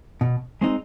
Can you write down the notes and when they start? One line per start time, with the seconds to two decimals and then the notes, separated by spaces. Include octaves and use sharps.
0.21 B2
0.61 G#3 C4 D#4